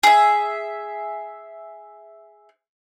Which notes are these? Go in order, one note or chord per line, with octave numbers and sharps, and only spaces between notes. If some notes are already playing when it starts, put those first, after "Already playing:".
G#4 E5